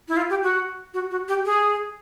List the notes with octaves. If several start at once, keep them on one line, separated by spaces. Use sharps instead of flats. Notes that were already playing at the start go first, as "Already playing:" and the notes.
E4
F4
G4
F#4
F#4
F#4
G4
G#4